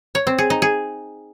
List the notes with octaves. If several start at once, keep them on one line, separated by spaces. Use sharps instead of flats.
C#5
C4
G#4
D#4
G#4